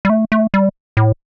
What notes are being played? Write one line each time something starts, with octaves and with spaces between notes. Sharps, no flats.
G3
A3
A3
G3
A2